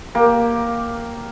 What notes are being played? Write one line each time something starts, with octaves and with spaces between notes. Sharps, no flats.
A#3 G4